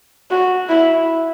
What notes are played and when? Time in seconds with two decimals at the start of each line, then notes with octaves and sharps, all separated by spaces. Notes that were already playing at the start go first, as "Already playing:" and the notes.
0.31 F#4
0.69 E4